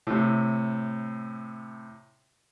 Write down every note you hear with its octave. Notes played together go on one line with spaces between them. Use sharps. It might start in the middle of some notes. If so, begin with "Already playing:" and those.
A2 C3